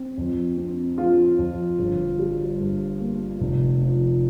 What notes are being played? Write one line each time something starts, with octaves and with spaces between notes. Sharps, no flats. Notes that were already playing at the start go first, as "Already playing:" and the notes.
Already playing: C4
F2
C4
F3 F4
F2
G1
G3
G2
A#3
F1
F3